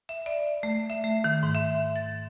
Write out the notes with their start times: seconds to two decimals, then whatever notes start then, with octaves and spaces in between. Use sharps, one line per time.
0.09 E5
0.26 D5
0.63 A3
0.90 E5
1.04 A3
1.24 D#3
1.43 G#2
1.55 E5
1.96 A6